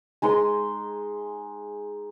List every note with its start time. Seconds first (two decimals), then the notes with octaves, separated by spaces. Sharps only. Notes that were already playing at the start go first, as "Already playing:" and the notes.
0.22 G#3 D#4 C6